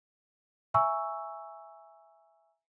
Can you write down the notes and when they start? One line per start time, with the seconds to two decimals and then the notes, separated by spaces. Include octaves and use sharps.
0.74 E5 G#5 A#5 C#6 E6